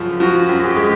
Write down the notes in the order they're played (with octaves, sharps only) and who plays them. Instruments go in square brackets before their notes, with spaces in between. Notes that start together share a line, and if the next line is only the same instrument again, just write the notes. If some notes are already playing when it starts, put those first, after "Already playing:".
Already playing: [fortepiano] F#2 C#3 F3
[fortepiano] F3 [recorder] F#4
[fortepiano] F#2
[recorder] G#4
G4
[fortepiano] G#3